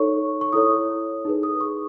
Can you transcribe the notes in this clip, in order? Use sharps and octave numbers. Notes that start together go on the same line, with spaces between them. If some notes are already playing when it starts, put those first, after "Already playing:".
Already playing: D#4 A4 C#5 C#6
C#6
E4 A4 C#5 D#6
D#4 G#4 B4
D#6
C#6